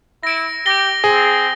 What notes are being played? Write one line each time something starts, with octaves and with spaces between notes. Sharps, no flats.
E4 A#6 D7
G4 A#6 G7
C4 G#4